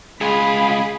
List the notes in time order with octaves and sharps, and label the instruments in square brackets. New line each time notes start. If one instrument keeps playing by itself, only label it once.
[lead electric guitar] C#2 F4 [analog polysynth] G#4 [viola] B5